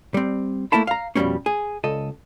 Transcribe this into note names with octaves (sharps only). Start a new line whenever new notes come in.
G3 C4
A3 A#3 E4 A5 B5
F5 A#5
F2 B2 D3 G3 A#3 C#4
G#4
C#2 A4 D#5